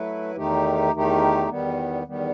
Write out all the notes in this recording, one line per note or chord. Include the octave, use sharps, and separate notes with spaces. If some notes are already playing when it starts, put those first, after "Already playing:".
Already playing: F#3 A3 E4 B4
E2 D#3 A3 D#4 G4
E2 D#3 A3 D#4 G4
E2 D#3 G3 B3
E2 D#3 G3 B3